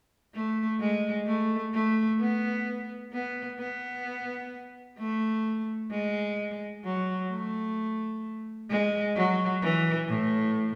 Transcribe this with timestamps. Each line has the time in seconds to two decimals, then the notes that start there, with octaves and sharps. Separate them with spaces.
0.34 A3
0.80 G#3
1.27 A3
1.74 A3
2.20 B3
3.13 B3
3.59 B3
4.98 A3
5.91 G#3
6.84 F#3
7.30 A3
8.70 G#3
9.16 F#3
9.62 E3
10.09 A2